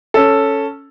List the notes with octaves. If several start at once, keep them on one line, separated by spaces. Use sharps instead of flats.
C#4 A4